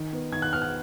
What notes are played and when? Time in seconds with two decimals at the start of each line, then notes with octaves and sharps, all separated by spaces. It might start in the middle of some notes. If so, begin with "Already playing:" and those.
Already playing: D#3
0.13 B3
0.32 D#3 G#6
0.42 F#6
0.53 B3 F6
0.62 F#6